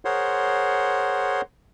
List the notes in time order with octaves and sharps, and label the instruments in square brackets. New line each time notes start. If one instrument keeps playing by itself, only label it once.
[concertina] G#4 A#4 C5 C#5 F#5 C6